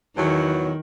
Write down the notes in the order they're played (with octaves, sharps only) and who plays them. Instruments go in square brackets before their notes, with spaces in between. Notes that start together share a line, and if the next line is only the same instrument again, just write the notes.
[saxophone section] E2 F#3 [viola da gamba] D#3